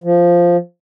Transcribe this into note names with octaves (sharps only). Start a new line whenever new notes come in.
F3